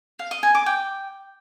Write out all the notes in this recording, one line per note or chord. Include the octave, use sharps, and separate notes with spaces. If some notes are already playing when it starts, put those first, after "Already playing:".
F5
D#5
G#5
D6
G5